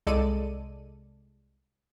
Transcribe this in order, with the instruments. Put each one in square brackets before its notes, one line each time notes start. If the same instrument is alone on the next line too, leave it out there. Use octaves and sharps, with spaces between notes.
[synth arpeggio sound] C2 G#3 A4 D5 D#7